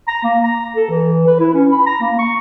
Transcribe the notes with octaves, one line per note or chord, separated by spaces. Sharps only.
A#5
A#3
A#5
A4
E3
B4
E4
C#4
B5
A#5
A#3
C#6